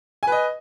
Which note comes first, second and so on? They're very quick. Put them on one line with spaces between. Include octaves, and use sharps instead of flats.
G#5 B4 D#5